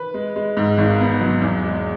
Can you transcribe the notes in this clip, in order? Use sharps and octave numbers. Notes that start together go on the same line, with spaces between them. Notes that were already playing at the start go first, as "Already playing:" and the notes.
Already playing: B4
G#3
G#3
G#2
G#1
B3
F#3
E2
G#3